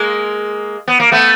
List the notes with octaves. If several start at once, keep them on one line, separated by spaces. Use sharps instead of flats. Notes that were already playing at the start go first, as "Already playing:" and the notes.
Already playing: G#3 A#3
B3
A#3
A3 B3